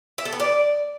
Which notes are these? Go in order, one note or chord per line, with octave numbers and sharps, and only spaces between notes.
E5
A4
B3
D5